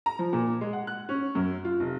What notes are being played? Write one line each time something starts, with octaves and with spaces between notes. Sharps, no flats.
A#5
F3
A#2
G#3
F#5
F#6
C#4
F#2
F4
F1